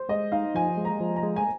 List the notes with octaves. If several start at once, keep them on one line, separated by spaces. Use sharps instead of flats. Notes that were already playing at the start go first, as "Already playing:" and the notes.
Already playing: C5
G#3 D#5
D#4 F5
F3 G#5
G#3
A#5
F3
A#5
G#3
G#5